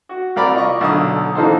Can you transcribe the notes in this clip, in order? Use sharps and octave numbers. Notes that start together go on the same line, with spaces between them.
F#4
C2 A#4 D5 B5
F4 D#5 C#6
B1 D3 D#6
E3 A#3 D#4 A4 C5